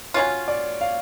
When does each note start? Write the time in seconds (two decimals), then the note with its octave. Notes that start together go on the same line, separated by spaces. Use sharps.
0.14 F#3 C#4 F4 C#5
0.48 D5
0.81 F5